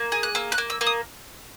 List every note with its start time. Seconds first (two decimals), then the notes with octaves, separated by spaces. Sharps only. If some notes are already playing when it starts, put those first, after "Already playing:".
Already playing: A#3
0.12 G#4
0.23 F#6
0.35 A#3 E6
0.52 F#6
0.58 A#3
0.70 E6
0.81 A#3
0.86 D#6